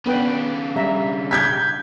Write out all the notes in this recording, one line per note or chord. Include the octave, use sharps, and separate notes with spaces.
C#3 B3 D4 B4 G5
G3 E5 A#5
G6 G#6 B6